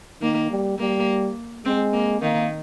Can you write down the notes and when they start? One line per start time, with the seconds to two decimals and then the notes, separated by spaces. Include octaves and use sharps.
0.21 D#3 A#3
0.50 G3
0.79 G3 A#3
1.65 G#3 C4
1.93 A#3
2.22 D#3 A#3